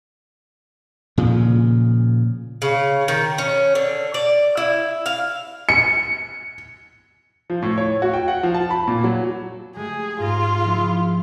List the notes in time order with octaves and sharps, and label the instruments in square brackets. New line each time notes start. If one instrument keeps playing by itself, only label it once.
[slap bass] A#2 C#3 F3
[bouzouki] C#3
D#3
C#4
D3
D5
E4
F5
[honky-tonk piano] C#7
[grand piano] F3
A2
C#5
F#4
G5
F#5
F3
A5
B5
A#2
F#3
[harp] G#3 A3 G4 [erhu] G#4
[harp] G#2 A#6 [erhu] F4
[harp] F3 G#3 E4